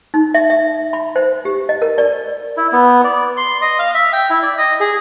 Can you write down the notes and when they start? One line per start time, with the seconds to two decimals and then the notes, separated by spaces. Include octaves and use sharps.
0.14 D#4
0.34 E5
0.50 E5
0.93 B5
1.16 C5
1.45 G4
1.69 D#5
1.82 A#4
1.98 D5
2.57 E4
2.72 B3
3.04 D5
3.37 C6
3.62 D#5
3.79 F5
3.94 E5
4.13 G5
4.30 E4
4.43 D5
4.58 D#5
4.80 G#4